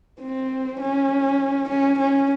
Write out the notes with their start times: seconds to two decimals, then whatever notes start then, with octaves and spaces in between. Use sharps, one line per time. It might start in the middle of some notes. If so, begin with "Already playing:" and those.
0.20 C4
0.80 C#4
1.69 C#4
1.99 C#4